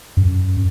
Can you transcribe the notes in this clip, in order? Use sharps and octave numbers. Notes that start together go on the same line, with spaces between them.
F#2